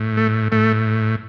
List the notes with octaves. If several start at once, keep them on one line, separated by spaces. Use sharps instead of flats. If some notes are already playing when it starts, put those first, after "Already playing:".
Already playing: A2
A3
A2 A3